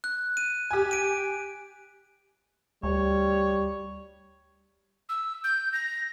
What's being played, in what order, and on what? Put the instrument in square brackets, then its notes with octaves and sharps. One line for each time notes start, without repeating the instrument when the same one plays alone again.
[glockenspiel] F#6
D#7
[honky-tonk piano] G4 G#5
[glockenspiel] D7 D#7
[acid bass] D2 [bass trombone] G3 [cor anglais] C#5
[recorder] E6
G6
A#6